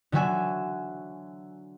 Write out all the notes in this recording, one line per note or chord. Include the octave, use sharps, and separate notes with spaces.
D3 F#3 F#4 E5 G#5